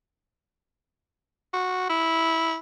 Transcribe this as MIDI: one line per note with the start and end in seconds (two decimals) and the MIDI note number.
1.53 1.88 66
1.90 2.57 64